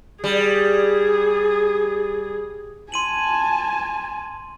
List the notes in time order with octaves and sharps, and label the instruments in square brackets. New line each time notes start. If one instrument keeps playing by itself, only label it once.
[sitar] G3 [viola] G#4
[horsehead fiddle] G#5 A5 [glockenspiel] C6 D#7 F#7